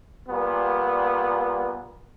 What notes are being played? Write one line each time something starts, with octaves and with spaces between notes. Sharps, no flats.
A#2 G3 B3